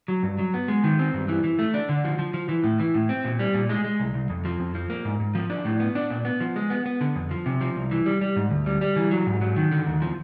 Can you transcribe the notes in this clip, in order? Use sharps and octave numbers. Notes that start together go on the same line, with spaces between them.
F#3
G2
F#3
B3
G#3
D#3
C4
G2
E3
E3
A3
D4
D3
F3
F3
F3
E3
A2
E3
A2
C4
A#2
G3
A#2
G#3
G#3
C2
C2
F2
F3
F2
F3
A#3
G#2
G#2
F3
D4
A2
B3
D4
A#2
B3
F3
G#3
B3
B3
D3
F2
F3
C3
F3
C2
E3
G3
G3
G#2
D2
G3
G3
E3
F#3
G#2
F#3
D#3
D3
D#2
F3